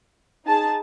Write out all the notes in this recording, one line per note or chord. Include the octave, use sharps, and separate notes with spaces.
D#4 G#4 A5